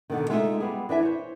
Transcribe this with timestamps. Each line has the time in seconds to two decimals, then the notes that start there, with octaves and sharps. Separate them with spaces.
0.10 B2 D3 D#3
0.30 G#3 A3 D#4 F4 D#5 E5
0.60 G3 B3 G#4
0.89 E3 D4 E5 G#5
1.03 C5 C#5